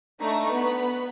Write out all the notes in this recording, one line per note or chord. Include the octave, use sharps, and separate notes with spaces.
A3 D4 D#4 A#5 C#6
B3 B5